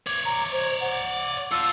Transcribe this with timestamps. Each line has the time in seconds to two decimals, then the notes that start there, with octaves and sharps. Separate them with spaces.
0.07 C#5 D5
0.25 A#5
0.52 C5
0.81 F#5
1.52 F4 A4 E6